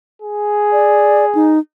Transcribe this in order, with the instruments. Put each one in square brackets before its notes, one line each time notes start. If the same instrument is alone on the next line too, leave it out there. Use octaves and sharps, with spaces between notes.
[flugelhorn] G#4
[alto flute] D5
D#4